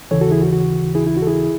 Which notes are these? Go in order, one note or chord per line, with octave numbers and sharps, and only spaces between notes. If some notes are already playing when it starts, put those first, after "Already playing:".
D#2 C#3 E3 A4 C#5
F#4 A4
E4 G#4
F#4
F#4
E4 G#4
E4
F#4
A4
E4 G#4